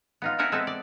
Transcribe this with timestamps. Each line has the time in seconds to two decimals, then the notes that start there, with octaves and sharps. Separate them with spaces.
0.22 B3 D#4 F4
0.38 B3 C4 A#4 E5 F#5 G#5
0.52 G#3 B3 C4 A4 B4 E5
0.67 D5